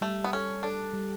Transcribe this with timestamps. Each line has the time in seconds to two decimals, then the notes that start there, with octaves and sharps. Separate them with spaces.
0.01 G3 A3
0.24 B3
0.33 C#4 A4
0.63 D4 A4
0.94 G3